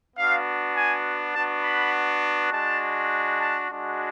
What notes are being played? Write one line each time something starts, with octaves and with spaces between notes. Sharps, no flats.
B3 D4 F#4 F5
G#5
B3 D4 F#4 A5
B5
G#3 D4 F#4 A5
A5
G#3 D4 F#4